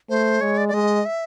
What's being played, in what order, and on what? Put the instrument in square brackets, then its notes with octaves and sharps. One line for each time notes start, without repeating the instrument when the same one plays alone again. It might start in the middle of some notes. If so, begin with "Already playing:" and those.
[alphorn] A3 [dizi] C5
[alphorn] G#3 [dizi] C#5
[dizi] D5
D5
[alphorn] G#3 [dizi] D#5
[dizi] E5